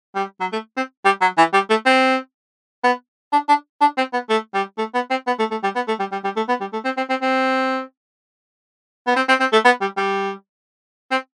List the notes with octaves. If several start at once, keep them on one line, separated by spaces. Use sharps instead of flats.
G3
F#3
A3
C4
G3
F#3
E3
G3
A3
C4
B3
D4
D4
D4
C4
B3
A3
G3
A3
B3
C4
B3
A3
A3
G3
B3
A3
G3
G3
G3
A3
B3
G3
A3
C4
C4
C4
C4
B3
C4
C4
C4
A3
B3
G3
G3
C4